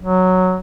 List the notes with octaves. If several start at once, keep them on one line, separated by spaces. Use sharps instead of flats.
F#3